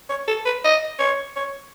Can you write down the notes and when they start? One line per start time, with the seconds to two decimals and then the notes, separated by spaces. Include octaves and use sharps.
0.09 C#5
0.28 A4
0.46 B4
0.64 D#5
0.99 C#5
1.36 C#5